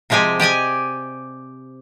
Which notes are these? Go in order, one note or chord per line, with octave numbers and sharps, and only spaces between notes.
C3 F3 G#3 G4 G#5
G4 D5 D#5 G#5